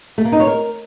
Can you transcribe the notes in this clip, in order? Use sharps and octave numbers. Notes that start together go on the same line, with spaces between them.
A3
A#3
D#4
C#5
A#4